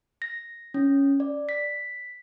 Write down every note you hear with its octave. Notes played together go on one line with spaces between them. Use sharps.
A#6
C#4
D5
B6